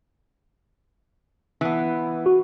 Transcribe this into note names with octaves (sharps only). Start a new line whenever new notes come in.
E3 B3
F#4